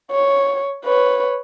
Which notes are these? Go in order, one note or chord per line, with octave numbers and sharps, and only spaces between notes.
C#5
B4 C#5